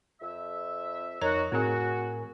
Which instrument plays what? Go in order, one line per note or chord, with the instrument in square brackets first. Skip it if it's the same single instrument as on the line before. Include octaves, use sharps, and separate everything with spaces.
[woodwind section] F2 E5
[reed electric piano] F2 [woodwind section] D#4 F#4 [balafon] A#4 C#5 A#5
[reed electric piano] A2 A#4 G#5 [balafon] C4 G#4 [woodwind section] F#4